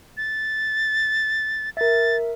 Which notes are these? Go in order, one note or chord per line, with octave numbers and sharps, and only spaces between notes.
A6
A#4 E5 A6